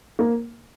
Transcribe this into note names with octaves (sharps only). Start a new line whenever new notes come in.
A#3